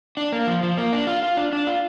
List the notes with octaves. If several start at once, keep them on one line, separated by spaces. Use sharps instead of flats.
D4
A#3
F3
F3
A#3
D4
F4
F4
D4
D4
F4